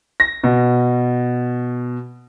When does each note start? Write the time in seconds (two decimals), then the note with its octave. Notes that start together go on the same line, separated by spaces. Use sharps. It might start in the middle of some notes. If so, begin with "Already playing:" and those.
0.20 A#6
0.44 B2